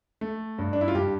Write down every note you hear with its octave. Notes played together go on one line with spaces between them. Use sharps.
A3
G2
D4
E4
F4
G2 G4